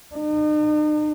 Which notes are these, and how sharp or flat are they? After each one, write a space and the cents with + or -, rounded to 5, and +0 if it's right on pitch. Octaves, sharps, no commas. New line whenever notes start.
D#4 -45